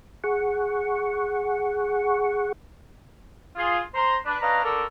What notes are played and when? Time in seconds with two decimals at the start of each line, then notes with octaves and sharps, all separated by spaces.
0.24 G#4 F#5 C#6
3.56 F4 G#4
3.94 C5 A#5 C6
4.26 D4 B4
4.41 C#4 D4 B4 D#5 F5 A#5
4.64 D3 A4 A#4 D5 C#6 E6